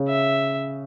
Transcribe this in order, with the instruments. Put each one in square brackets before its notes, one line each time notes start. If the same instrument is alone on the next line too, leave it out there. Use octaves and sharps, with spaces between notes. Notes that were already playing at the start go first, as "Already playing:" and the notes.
Already playing: [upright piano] C#3
[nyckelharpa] E5